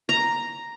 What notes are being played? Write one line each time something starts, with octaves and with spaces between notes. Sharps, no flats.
A#5